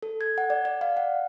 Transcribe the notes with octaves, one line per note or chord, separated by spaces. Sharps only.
A4
G#6
F#5
D5
D5
F5
F#5